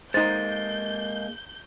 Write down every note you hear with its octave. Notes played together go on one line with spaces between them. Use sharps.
G#3 A#3 D#4 C5 G6 A6